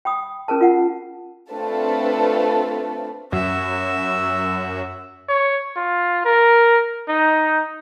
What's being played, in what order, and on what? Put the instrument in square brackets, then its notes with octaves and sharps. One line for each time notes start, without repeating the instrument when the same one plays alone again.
[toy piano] G5 B5 D#6
C#4 G#4 A#4 B4 A5
F4 F#5
[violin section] A3 C4 D4 F4 A4 B4
[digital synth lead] F#2 [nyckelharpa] F#4 E5
[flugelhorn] C#5
F4
A#4
D#4